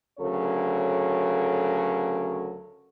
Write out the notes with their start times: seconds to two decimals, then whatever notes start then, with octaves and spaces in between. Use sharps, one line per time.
0.19 D2 C#3 F#3 A4 A#4 C#5